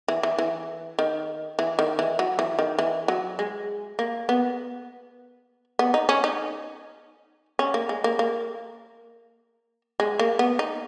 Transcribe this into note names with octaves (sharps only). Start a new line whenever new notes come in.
E3
E3
E3
D#3
E3
D#3
E3
F#3
E3
D#3
E3
F#3
G#3
A#3
B3
B3
D#4
C#4
D#4
C#4
A#3
G#3
A#3
A#3
G#3
A#3
B3
D#4